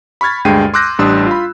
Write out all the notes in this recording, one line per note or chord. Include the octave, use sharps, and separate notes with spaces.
B5 C#6 F6 G#6 A6
D2 G2 G#3 G5 C7 D#7
C6 D6 E6 F#6 G6 A#6
A1 G3 D4 C6 D#6 E6
F4 B5